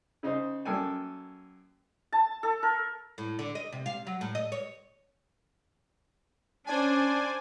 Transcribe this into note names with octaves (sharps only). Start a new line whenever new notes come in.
C#3 D#4 C5
F#2 A#3 A4 G5 G#5
A5
A4
A#4
A2
D3
D#5
C3
F5
F#3
A2
D#5
C#5
C#4 D4 C5 D5 G#5